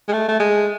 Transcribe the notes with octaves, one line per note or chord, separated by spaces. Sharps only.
G#3
A3
A3
G#3